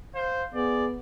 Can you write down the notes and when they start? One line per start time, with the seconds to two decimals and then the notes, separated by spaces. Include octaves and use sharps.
0.15 C5 F5
0.55 B3 G#4 D5